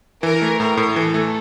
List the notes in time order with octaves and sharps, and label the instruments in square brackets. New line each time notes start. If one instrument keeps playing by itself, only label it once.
[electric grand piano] E3 [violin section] A#4
[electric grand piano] A3
[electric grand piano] A2 [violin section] A#4
[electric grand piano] A2
[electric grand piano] E3 [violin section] A4
[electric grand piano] A3